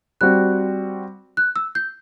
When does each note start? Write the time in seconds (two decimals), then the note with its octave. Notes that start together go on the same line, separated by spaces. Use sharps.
0.21 G3 C4 F#4 F#6
1.37 F#6
1.56 E6
1.75 G6